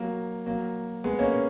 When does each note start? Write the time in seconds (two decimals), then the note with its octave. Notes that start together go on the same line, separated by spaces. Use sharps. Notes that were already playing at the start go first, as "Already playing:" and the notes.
Already playing: F#3 A#3
0.46 F#3 A#3
1.04 G#3 B3
1.19 A#3 C#4